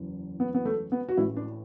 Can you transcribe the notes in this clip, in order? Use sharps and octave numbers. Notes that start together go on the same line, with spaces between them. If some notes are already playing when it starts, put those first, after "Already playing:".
Already playing: F#1 E2 E3
B3
B3
A3
B3
F#4
A1 A2 E3 E4
D4